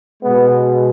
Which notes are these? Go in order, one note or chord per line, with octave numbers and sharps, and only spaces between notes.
B2 G#3 B3